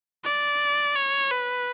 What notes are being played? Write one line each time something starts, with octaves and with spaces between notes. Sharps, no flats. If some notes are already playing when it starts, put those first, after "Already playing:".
D5
C#5
B4